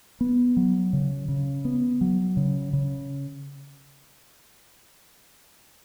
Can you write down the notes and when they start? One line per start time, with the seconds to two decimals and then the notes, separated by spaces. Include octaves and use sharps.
0.21 B3
0.57 F#3
0.93 C#3
1.28 C#3
1.65 B3
2.01 F#3
2.37 C#3
2.73 C#3